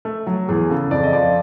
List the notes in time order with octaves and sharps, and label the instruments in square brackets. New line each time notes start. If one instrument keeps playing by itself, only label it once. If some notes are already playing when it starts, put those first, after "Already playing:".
[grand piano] A3
F#3
E2 G#4
C#3 A4
F2 D5
D#5
F3 D5